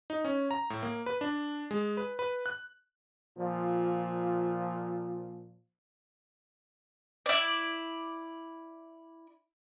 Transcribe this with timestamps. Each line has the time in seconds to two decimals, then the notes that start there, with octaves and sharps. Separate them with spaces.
0.10 D#4
0.25 C#4
0.51 A#5
0.70 A2
0.83 A#3
1.06 B4
1.21 D4
1.71 G#3
1.97 B4
2.19 B4
2.46 F#6
3.38 A#2 F3
7.26 E4 D5